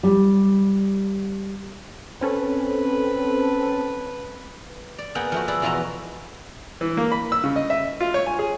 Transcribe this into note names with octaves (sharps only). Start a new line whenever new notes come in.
G3
C4 C#4 A4 B4
D5
A#3 B3 G#4 F#5 G5
F3 A3 F#4
G#4 A4 B4 D5
E2 B2 E3 F4 F#4 A#5
E3
A#3
B5
E6
C#3
D#5
E5
F4
C#5
G#5
G#4